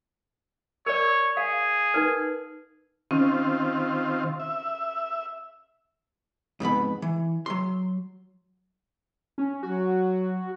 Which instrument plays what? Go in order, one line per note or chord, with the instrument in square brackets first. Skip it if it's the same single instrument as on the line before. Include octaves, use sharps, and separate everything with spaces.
[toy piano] A#4 D5 [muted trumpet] C#5
[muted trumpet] G#4 [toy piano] F5
[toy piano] D#4 A#4 B4
[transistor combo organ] D#3 C4 F4 [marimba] C#4
[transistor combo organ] E5
[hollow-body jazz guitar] F2 G#2 B3 B5
E3
F#3 C6
[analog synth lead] C#4
[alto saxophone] F#3 [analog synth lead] F#4